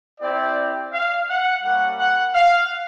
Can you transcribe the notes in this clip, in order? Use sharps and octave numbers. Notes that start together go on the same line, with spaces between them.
C4 E4 G4 D5
F5
F#5
G3 A#3 C#4 F#5
F#5
F5